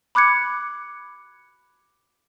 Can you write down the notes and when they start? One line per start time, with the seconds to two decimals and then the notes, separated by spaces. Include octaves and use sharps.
0.15 B5 D6 F#6 G#6 C#7